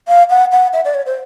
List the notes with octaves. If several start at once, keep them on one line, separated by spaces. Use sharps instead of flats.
F5
F#5
F#5
E5
D5
C#5
C5